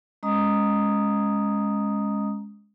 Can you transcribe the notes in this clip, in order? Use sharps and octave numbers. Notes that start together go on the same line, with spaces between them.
G#3 C#4 D#5 A#5 D#6